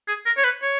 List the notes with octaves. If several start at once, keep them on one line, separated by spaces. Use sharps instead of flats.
G#4
A#4
C#5
B4
C#5